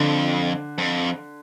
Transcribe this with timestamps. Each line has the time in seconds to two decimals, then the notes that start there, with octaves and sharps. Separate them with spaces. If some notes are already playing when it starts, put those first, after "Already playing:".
Already playing: F2 D3
0.78 F2